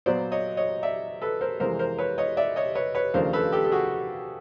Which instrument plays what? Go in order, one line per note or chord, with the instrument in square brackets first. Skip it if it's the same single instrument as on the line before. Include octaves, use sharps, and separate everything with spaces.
[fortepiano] A#2 F#3 B3 C5 D5
C#5 D#5
C#5 D#5
D5 E5
A4 B4
A#4 C5
F2 C3 E3 G#3 A#4 C5
A#4 C5
B4 C#5
C#5 D#5
D5 E5
C#5 D#5
B4 C#5
B4 C#5
D#2 C#3 F3 A3 D4 A#4 C5
A4 B4
G4 A4
A4
F#4 G#4